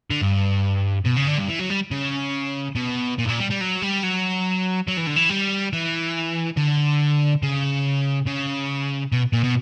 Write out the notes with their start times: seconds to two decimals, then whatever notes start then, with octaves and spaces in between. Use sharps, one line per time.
0.10 D3
0.21 G2
1.06 B2
1.17 C#3
1.27 D3
1.38 G2
1.49 E3
1.59 F#3
1.70 G3
1.91 C#3
2.76 B2
3.18 A#2
3.25 G2
3.28 A#2
3.40 G3
3.50 G3
3.61 F#3
3.82 G3
4.03 F#3
4.87 F#3
4.97 E3
5.07 D3
5.16 E3
5.30 G3
5.73 E3
6.57 D3
7.43 C#3
8.26 C#3
9.12 B2
9.33 A#2
9.44 B2